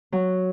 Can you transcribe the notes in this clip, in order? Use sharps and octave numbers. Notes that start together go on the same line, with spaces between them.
F#3